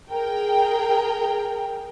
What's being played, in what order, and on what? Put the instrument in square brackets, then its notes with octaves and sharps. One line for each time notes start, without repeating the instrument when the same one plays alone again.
[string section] G#4 A#4 G5